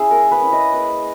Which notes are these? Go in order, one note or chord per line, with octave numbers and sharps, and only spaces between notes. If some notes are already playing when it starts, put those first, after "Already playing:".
Already playing: C#4 E4 G#4 E5
A#3 A#4
B4
C#4 E4
D#5
A#3 B4